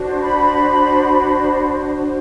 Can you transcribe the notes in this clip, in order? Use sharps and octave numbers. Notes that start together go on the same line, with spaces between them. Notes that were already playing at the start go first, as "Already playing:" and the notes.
Already playing: D4 F#4 C5
B5